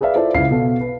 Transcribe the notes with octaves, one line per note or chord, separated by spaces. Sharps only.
G#4 B4 D5 E5 F5
E4 F4 A4 C5 D5 E5
C#2 C#3 E4 F5 C7
B2 A4 F5
B4